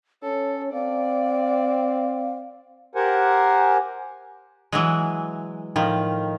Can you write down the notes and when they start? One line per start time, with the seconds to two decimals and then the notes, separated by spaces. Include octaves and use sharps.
0.23 C#4 A4 C#5
0.73 C4 D5 F5
2.95 G4 A#4 C5 F#5 G#5
4.72 E3 F#3 G#3
5.76 A2 D#3 F3